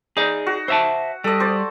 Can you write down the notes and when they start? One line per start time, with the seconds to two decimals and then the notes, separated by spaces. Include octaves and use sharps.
0.17 D#4 G#4 D5
0.46 F#4
0.68 C5 E5 A5 E6
1.24 G3 A4 D#5
1.40 C5 D5